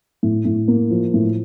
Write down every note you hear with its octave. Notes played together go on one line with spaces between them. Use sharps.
A2
A2
A#3
F3
A2